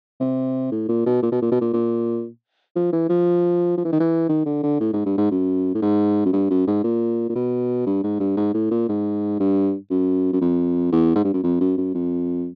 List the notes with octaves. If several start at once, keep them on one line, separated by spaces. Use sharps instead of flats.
C3
A2
A#2
B2
A#2
B2
A#2
B2
A#2
A#2
F3
E3
F3
F3
E3
D#3
E3
D#3
D3
D3
A2
G#2
G2
G#2
F#2
A2
G#2
F#2
G2
F#2
G#2
A#2
A#2
B2
G2
G#2
G2
G#2
A2
A#2
G#2
G2
F#2
F#2
F2
E2
G#2
G2
F#2
F2
F#2
F#2
F2